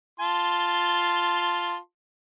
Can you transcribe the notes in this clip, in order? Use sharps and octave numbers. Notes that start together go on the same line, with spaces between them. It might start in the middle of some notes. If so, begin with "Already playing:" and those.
F4 A5 C6